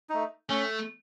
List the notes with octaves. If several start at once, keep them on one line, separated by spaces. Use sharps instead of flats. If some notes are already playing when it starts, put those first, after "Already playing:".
A3 D#4
A3 C#4